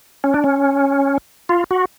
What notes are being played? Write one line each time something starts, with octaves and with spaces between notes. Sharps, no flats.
C#4
D4
C#4
F4
F#4